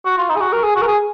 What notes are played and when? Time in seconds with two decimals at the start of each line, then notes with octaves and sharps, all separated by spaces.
0.06 F#4
0.18 F4
0.30 D#4
0.36 G#4
0.41 F#4
0.53 A#4
0.64 G#4
0.76 F#4
0.82 A#4
0.87 G#4